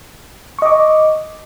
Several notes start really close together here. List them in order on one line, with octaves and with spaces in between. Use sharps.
C#6 D#5 D6